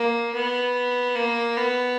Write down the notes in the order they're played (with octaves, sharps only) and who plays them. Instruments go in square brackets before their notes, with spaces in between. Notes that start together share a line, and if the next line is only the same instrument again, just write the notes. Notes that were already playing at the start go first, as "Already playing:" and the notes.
Already playing: [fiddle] A#3
B3
A#3
B3